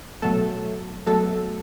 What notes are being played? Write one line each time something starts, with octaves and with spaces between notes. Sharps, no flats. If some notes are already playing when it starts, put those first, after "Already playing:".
B2 F#3 A3 A4
B2 F#3 A3 A4